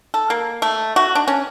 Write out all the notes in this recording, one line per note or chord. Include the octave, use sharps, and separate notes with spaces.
A4
A#3
A3
F#4
D4
C#4